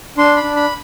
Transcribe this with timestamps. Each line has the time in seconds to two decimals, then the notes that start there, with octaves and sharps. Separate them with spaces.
0.17 D4 C6
0.36 B5
0.43 D4
0.56 B5